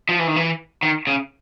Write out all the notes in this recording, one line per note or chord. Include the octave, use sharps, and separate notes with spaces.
F3
E3
D#3
E3
D#3
C#3